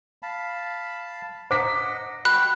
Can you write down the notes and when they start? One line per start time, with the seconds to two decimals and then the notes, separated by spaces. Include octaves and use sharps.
0.23 F5 A5 B5
1.51 C5 D#5 F#5 A#5 D6 B6
2.25 F#4 G5 B5 F#6